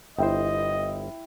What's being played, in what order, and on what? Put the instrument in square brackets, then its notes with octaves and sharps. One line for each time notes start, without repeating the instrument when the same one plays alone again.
[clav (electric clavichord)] G1 C5 [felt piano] E4 G5 [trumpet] D#5